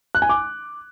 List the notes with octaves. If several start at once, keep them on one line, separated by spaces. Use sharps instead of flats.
F#6
G#5
D6